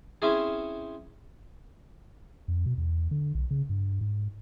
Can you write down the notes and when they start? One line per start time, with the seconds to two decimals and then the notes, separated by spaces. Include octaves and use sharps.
0.22 C4 C#4 E4 G#4
2.48 F2
2.66 B2
2.78 E2
3.11 D3
3.35 B1
3.51 C#3
3.70 G2
4.01 G#2